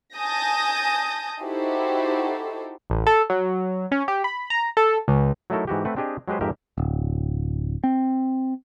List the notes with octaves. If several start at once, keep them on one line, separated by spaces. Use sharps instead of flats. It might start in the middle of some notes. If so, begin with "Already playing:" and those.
G#5 A5 D#6 G6 A#6
D#4 E4 F#4 G4 A4 C5
A1
A4
F#3
C#4
G4
B5
A#5
A4
C#2
F#3 A3 D#4 E4 A4 A#4
G#2 E3 F#4 G4
A3 C4 B4 F#5
C4 D4 G4 G#4 D#5
F#3 G#3 G4 B4 C5
F2 G#2 G4 A#4 E5
D1
C4